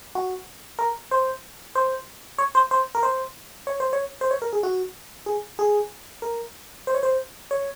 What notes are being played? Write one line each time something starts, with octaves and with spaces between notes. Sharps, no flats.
F#4
A#4
C5
C5
C#5
C5
C5
A#4
C5
C#5
C5
C#5
C5
C#5
A#4
G#4
F#4
G#4
G#4
A#4
C5
C#5
C5
C#5